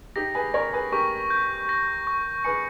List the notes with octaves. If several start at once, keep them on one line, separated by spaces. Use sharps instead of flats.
D#4 G4 A#6
G#4 B4
A#4 C#5 A#6
G#4 B4
G4 A#4 C#6
G6
A#6
C#6
G#4 B4 C#7